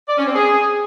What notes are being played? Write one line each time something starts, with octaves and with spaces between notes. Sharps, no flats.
D5
C#4
C4
G#4